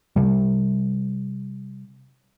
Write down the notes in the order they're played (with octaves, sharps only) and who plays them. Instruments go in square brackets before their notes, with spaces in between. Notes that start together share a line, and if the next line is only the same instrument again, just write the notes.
[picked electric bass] C3 G3